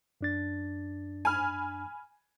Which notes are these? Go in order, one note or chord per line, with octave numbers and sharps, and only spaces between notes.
F#2 D4 A6
G#5 B5 F6